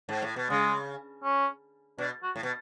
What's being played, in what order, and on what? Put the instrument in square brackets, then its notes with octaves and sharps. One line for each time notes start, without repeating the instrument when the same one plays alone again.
[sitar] G#2
A2
B2
[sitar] C#3 [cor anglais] G#3
[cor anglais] C#4
[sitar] B2 [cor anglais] D4
[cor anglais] F#4
[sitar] A2
B2